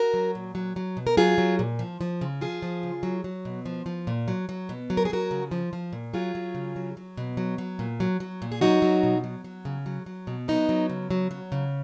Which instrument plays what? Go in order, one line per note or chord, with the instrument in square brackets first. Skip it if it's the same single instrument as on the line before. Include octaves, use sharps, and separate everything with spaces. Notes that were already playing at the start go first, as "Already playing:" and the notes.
Already playing: [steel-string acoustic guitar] F#4 A#4
F#3
A#2
F#3
F#3
B2
A#4
F#3 F4 G#4
F#3
A#2
F3
F3
C#3
F3 F4 G#4
F3
C#3
F#3
F#3
B2
F3
F3
A#2
F#3
F#3
B2
F#3
A#4
G#4
F#3 F#4 A#4
C#3
F3
F3
A#2
F#3 F4 G#4
F#3
C#3
F#3
F#3
B2
F#3
F#3
A#2
F#3
F#3
A#2
G#4
F#3 D#4 F#4
F#3
B2
F#3
F#3
C#3
F#3
F#3
B2
F#3 B3 D#4
F#3
C#3
F#3
F#3
C#3